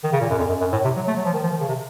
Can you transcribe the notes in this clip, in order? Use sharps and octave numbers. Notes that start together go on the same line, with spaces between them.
D#3
C#3
A#2
F#2
F2
F#2
F#2
A2
C3
F#3
A3
F#3
F3
D#3
F3
D#3
C#3
C3